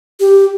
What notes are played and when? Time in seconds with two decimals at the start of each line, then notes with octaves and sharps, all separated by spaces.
0.20 G4